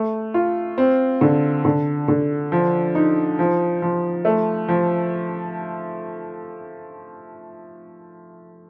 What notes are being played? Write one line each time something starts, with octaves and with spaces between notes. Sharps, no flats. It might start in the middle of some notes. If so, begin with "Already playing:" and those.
Already playing: A3
F4
C4
D3
D3
D3
F3
D#4
F3
F3
A3
F3